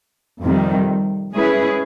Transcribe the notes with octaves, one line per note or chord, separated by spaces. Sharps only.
F2 C3 D#3 G3
G#3 C#4 E4 G#4 B4